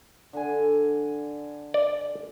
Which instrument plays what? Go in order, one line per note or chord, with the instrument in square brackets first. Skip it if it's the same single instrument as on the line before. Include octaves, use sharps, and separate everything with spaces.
[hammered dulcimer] D3 G#5
[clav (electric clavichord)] D5